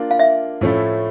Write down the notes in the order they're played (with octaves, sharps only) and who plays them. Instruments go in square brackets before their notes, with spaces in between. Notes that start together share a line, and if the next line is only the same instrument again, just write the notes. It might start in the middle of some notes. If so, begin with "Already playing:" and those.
Already playing: [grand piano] A#3 D4 F4
[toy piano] F5
E5
[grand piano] A2 F3 A3 C#4 E4